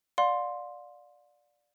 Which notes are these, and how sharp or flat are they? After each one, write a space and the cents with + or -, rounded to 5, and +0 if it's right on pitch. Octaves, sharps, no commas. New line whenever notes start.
D5 +0 F5 +35 C6 +0